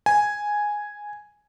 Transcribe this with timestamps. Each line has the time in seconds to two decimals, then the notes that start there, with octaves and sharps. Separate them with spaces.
0.06 G#5